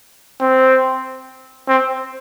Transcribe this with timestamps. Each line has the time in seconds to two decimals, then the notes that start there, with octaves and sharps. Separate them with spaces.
0.40 C4
1.68 C4